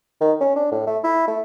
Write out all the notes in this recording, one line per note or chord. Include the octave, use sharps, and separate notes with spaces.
D#3
C#4
D4
A2
A3
E4
A3